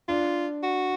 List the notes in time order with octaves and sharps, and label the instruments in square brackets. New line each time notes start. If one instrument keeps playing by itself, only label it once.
[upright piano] D4 [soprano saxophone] F4
[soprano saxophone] F#4